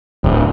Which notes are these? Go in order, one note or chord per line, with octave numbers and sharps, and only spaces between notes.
D1